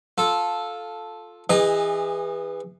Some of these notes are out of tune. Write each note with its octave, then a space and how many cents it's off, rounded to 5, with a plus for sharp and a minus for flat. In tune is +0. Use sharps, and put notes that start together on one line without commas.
F4 +10 A4 -5
E3 +0 G#4 -35 D#5 +0